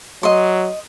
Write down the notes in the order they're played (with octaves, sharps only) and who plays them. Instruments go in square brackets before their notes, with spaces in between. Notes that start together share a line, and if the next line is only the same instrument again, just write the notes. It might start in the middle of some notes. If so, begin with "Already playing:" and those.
[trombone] F#3 [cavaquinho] D#5 C6